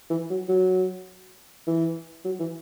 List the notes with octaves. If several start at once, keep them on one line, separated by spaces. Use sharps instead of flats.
E3
F#3
F#3
E3
F#3
E3